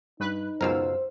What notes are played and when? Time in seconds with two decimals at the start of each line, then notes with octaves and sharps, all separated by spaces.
0.20 G2 D#4 B4 F#6
0.61 C#2 F#2 B2 A#4 C5 F5 E6